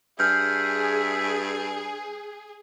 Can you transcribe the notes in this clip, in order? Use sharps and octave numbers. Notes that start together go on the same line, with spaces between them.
G2 G#4 E5 F6 G6